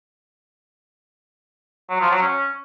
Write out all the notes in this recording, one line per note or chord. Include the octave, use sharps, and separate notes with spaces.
F#3
F3
F#3
C#4